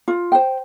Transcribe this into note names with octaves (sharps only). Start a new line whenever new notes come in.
F4
C5 G5